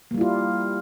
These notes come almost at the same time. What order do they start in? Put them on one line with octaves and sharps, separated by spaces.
A#3 G3 E4 F4